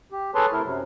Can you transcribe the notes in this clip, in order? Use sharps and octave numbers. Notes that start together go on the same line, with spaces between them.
G4
G#4 A4 B4 C#5 A5 C6
C3 A3 E4 A#4
F#2 C3 F#3